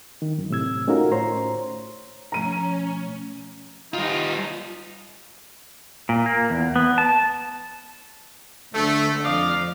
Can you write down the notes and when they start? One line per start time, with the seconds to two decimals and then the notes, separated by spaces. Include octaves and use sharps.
0.22 D#3
0.38 F#2
0.50 A2 C3 E6 G#6
0.87 A3 C#4 D#4 F4 F#4 A#4
1.11 A2 C5 C#5 A#5 C6
2.32 B2 F3 A3 C#4 A#5 D#7
3.94 G3 D#4 F4
6.09 A#2
6.26 A#3
6.50 E2
6.76 B3
6.98 A5
8.74 D2 D3 A3
9.24 F2 D5 D#5 F5